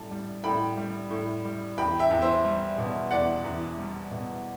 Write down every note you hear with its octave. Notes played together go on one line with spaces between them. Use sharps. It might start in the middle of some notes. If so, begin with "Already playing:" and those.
Already playing: A2 G3 A5
G3
A2 G5 B5
G3
A2
G3
E2 G5 B5
E5 G5
E2
C5 E5
G3
B2
E2 D5 F#5
E2
G3
B2